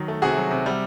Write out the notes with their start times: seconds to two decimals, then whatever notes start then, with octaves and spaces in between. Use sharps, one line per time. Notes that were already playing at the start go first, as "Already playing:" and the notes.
Already playing: D#3 F#3
0.08 A3
0.22 C3 F#4 G#4
0.37 F#3
0.51 C3
0.66 G3